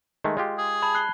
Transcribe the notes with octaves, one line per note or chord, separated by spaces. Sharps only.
D#3 G#3 A3
G#3 F4 G4
G#4
A5 B5 G#6
F#6 C7 G7